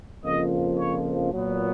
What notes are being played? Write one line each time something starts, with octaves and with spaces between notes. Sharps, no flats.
F2 C#3 F3 A#3 D#5
C#5
A#2 F#3 B3